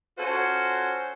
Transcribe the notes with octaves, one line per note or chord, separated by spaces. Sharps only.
C#4 F4 F#4 A4 C5